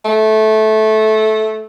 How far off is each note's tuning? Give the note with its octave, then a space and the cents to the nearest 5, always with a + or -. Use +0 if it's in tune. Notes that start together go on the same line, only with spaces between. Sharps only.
A3 -15